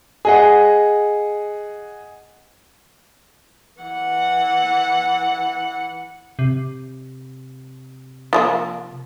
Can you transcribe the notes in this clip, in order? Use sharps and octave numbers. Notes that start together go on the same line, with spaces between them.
G#4 D#5 F#5
E3 F#5
C3
F3 A3 A#3